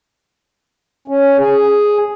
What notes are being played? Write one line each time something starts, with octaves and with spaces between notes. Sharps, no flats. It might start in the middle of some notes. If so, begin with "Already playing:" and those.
C#4
G#4